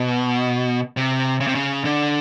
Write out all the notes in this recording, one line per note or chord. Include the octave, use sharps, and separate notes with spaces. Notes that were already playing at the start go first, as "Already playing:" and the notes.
Already playing: B2
C3
C#3
C3
C#3
D3